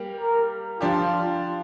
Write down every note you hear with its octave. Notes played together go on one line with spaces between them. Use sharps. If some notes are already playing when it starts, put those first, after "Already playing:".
Already playing: G3 A#3 G4
A#4
F3 D4 F4 G4